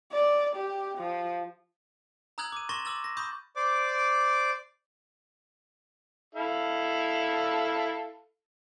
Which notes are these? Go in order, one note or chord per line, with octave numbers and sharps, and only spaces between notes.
D5
G4
F3
A#5 D#6 E6 F#6 G#6 F#7
D6 D#7
C6 C#6 A6 A#6 E7 F#7
D6 E6 A6 F#7
A#6
B5 C#6 D#6 G6
C5 D5 D6
E4 A4 F5